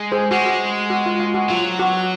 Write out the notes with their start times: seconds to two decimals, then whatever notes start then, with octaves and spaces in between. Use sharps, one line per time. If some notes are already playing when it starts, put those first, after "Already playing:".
Already playing: G#3
0.12 G#4 C5
0.31 G#3 F#4
0.46 F#4
0.90 F#4
1.06 F4
1.20 F4
1.34 F#4
1.50 F#3 F4
1.79 F#4